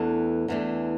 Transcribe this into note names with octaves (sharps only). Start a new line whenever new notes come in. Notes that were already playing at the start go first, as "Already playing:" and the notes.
Already playing: E2 E3 A3 D4 A4
E2 E3 A3 D4